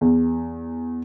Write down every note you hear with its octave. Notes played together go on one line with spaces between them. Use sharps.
E2